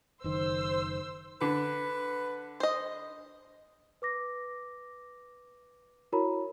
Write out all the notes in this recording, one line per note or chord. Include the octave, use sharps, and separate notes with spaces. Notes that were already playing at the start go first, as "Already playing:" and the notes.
F#1 D#3 C5 E6
D3 B4
C5 D#5
B4 D6 A#6
E4 F#4 A#4 C#5 A#5 B5